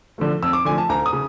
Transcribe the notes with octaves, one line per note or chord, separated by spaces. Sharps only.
D3 F3 A3
F2 E6
D6
D3 F3 A3 G#5
A5
D2 A#5
D#6
C#3